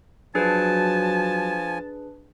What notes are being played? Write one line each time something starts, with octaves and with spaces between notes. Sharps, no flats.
F3 F#3 D4 G#4 B4 G#5 A5